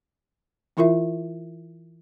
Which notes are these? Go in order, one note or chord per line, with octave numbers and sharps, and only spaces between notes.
E3 E4 F4 A#4 E5